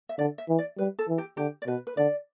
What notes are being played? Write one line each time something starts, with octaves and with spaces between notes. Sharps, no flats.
E5
D3 D5
E5
E3
D5
G3 B4
A4
E3
G4
D3 G4
D5
B2 B4
B4
D3 D5